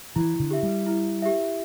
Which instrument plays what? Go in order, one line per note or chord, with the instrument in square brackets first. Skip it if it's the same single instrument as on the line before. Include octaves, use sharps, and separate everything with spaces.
[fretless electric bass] E3 [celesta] E4
[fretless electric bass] D3
[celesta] G4 E5
[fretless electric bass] G3
[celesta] E4
G4 E5